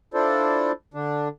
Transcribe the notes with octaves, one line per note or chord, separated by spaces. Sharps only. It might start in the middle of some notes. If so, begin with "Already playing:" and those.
D4 E4 F4 A4 C5 D5
D3 D4